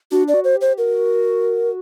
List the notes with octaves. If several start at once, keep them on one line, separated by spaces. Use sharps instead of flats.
D4 F#4
D5
F#4
C5
G4
C5
F#4 A#4